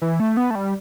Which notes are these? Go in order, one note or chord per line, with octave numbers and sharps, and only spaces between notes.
E3
A3
B3
A3
G3